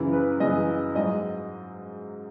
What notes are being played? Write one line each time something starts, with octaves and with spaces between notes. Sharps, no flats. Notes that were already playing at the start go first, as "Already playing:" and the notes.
Already playing: F#2 C#3 E3
B4
F#2 C#3 E3 D#5
G#2 F#3 D#5